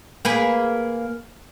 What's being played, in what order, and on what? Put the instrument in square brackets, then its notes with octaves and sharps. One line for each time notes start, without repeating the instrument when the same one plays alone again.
[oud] A#3 G#4 B4